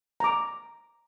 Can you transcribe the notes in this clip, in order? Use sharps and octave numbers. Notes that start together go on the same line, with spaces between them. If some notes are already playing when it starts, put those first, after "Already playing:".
A#5 D6